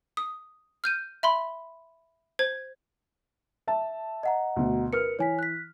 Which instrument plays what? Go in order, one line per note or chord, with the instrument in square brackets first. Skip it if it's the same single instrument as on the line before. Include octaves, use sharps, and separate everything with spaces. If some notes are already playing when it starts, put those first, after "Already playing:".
[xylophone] D#6
F6 G6 D#7
E5 B5 C6
C5 G#6
[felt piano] E5 A5
[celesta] D#5 F#5 A#5
[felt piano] D2 B2
[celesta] A#4 C#7 [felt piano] B4 F6
[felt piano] E3 [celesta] C#5 G#5 B6
[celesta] F#6 B6